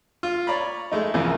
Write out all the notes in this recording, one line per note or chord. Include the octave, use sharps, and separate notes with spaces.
F4
C#5 D5 A#5 B5
G#3 A3 D#4
C2 F2 C#3 E3 A#3 A#4